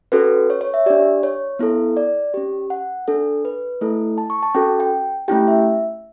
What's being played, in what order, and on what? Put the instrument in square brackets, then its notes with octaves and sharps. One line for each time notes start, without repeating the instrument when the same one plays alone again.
[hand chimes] C#4 F#4 A4 B4
C#5
C#5
E5
D4 G4 D5
C#5
B3 E4 A4
D5
C#4 G4
F#5
D4 A4
B4
A3 E4 A4
A5
C#6
A5
C#4 F#4 A4 G5
G5
A3 C#4 E4 G4 G5
E5